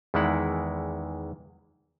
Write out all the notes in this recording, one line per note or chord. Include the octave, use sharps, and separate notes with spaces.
E2 D#3 E3 G#3 E4 F#5